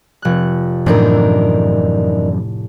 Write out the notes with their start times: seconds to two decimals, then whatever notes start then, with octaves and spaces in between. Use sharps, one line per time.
0.22 F1 F#6
0.86 F#2 A2 E3 F3 A3 D4 D#4 A#4